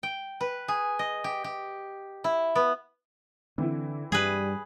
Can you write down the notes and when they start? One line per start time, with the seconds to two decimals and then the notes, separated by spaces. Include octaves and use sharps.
0.03 G5
0.41 B4
0.68 G#4
0.99 D#5
1.24 G4
1.44 G4
2.24 E4
2.55 B3
3.58 D3 E3 C4 E4
4.12 G2 G3 G#4 B4